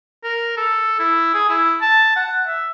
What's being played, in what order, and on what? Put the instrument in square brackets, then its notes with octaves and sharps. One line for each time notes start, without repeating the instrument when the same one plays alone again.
[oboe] A#4
A4
E4
G#4
E4
A5
F#5
E5